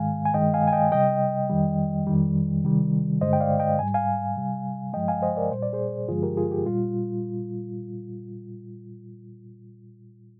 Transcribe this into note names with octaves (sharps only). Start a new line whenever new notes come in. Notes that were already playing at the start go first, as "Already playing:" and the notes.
Already playing: G#2 D#3 G#3 F5 G#5
G#5
G2 D#3 G#3 D#5 G5
F5 G#5
G#5
D#5 G5
C3 G3 D#5 G5
F2 D#3 G3
F2 D#3 G3
C3 D#3 G3
G2 D3 G#3 C5 D#5
G5
D5 F5
D#5 G5
G#2 G3 G#5
F5 G#5
C3 G3
G2 F3 G#3 D#5 G5
F5 G#5
C5 D#5
A#4 D5
A#2 G3 C5
D5
G#4 C5
G2 D3 F3 G#3 F4 G#4
G4 A#4
F4 G#4
G4
A#2 G3 F4